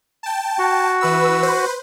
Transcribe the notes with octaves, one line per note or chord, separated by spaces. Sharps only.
G5 A5
F#4
E3 B4 E6
B4 C5